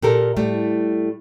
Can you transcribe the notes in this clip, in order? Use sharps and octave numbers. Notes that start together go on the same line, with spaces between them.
A#2 G4 A4 A#4
A2 G3 A3